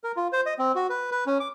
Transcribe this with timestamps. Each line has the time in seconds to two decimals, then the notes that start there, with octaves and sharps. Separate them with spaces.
0.04 A#4
0.16 F4
0.33 C5
0.46 D#5
0.59 C4
0.75 F#4
0.90 B4
1.12 B4
1.26 C#4
1.40 D6